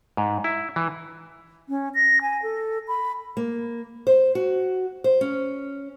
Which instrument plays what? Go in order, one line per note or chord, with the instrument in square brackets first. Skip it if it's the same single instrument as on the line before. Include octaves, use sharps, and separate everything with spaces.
[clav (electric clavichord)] G#2
E4
E3
[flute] C#4
A#6
G#5
A4
B5
[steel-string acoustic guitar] A#3
C5
F#4
C5
C#4